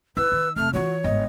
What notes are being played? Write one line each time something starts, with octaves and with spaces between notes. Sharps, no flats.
E4 B4 E6
D#3
F1 A3 F6
E3 F4 F#4 C#5
G1 G#2 D#5